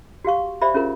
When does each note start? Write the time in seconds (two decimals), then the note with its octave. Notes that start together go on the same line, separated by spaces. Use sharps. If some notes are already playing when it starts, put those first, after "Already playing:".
0.25 F#4 G4 F5 C#6
0.61 G4 C5 D5 E5 B5
0.74 C#4 F4 G#4 A#4